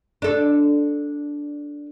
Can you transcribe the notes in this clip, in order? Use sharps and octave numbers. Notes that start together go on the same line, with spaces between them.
D4 A4